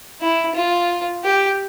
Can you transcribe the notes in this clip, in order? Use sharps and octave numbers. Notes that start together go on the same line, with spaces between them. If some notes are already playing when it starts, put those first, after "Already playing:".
E4
F4
G4